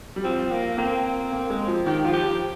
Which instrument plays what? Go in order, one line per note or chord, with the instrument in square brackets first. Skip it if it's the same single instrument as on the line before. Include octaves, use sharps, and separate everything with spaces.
[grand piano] G3
[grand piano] F3 [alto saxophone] C4
[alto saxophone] A#3
[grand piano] A#3 [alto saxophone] C4
[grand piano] A#3
G#3
F3
[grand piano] D#3 [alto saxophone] G4
[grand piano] F3 [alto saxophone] F4
[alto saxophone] G4
[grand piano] F3